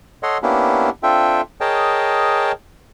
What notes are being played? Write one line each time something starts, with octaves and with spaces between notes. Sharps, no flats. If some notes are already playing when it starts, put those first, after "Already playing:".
A4 C#5 D#5 F#5 C6
A#3 B3 C#4 D4 E4 G4
C4 D4 F4 A4 E5 G5
G#4 A#4 C#5 D#5 G5 A5